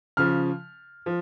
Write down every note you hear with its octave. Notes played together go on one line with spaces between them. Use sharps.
C#3 F3 F6
F3